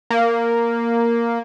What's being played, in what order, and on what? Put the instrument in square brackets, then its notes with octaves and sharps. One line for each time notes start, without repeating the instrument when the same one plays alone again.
[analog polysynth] A#3